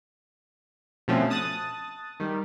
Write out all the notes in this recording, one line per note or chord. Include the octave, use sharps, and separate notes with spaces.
B2 D3 F3 A3 C4 C#4
A5 D#6 F#6 A6
D#3 G3